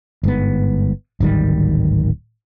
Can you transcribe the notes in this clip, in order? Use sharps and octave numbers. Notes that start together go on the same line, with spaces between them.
G1 G#2 B3
D1 G#1 D#3 G3